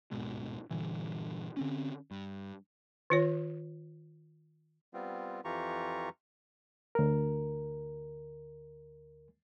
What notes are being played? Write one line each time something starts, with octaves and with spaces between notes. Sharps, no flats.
D1 G#2 B2 G#3
G2 A#2 D3 E3
D3 C4 C#4
G2
D#3 F4 C#5
G3 B3 C4 F4
F2 E3 F4 G4 A#5 C#6
D2 A#4